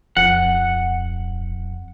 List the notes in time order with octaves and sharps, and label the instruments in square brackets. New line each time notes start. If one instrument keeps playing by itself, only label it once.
[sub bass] D1 [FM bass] F2 [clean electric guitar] F#5